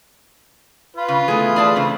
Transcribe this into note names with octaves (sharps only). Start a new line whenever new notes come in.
F4 B4
C#3
E3 A3 B3 G#4
G#4 D5 A5
C#3 C4